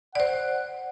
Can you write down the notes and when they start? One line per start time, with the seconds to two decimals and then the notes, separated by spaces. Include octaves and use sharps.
0.15 C5 D5 F#5